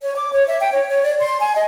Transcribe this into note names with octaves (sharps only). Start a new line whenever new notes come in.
C#5
D6
C#5
E5
G5
C#5
C#5
D5
C6
G#5
D#5